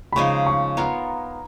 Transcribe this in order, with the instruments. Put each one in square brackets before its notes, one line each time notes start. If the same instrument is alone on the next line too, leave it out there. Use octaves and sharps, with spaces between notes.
[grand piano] B5
[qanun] C#3 F3 G#3 D#4 [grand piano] C#6
[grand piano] C#6
[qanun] B3 F4 A#4 C#5 [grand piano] A#5